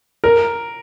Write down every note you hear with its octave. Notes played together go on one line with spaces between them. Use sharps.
A#4